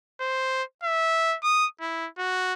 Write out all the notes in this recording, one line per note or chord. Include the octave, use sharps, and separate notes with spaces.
C5
E5
D#6
E4
F#4